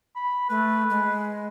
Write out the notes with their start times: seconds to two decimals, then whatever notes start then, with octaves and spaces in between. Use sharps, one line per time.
0.16 B5
0.50 A3 B4
0.90 G#3